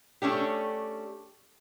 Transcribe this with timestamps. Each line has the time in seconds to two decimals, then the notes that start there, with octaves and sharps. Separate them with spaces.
0.22 A3 C#4 D4 G4